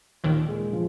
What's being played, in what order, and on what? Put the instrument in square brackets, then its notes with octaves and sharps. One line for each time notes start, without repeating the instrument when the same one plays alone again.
[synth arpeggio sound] D#2 D#3 [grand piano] A#2
[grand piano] G#3
F3